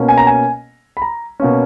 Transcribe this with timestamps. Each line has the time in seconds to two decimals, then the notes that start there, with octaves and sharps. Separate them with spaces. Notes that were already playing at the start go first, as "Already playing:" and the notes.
Already playing: B2 A#3 C#4
0.08 G#5
0.18 A#5
0.27 G#5
0.97 B5
1.02 A#5
1.40 B2 A#3 C#4